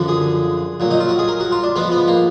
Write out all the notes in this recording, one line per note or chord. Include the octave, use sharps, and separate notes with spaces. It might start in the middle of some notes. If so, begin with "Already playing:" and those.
Already playing: F#2 D3 F3
G#4
A#2 F#3
D#4
F4
F#4
G#4
A#4
F#4
F4
D4
G#2 F3 B3
B3
A#3